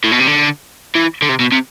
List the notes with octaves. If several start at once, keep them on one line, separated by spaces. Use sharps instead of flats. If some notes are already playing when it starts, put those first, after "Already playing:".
A2
B2
C3
D3
E3
D3
C3
B2
C3